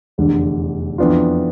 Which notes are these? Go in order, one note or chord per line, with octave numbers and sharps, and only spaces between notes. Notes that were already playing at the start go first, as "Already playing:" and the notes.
F1 E2 D3
F2 E3 B3 D4 F4